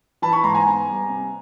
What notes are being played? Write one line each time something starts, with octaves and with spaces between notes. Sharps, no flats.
E3 A5 B5
B5 C#6
G#2 A#5 C6
G#5 A#5
B3
G3
C3